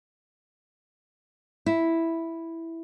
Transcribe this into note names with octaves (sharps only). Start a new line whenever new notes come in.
E4